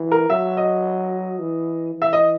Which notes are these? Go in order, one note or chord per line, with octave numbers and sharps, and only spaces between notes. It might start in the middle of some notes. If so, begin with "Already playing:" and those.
Already playing: E3
A#4
F#3 E5
D#5
E3
E3
E5
D#5